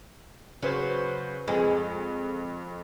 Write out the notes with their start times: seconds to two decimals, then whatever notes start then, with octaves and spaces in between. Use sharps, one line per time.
0.63 C#3 F#3 B4 C5
1.48 F2 G#3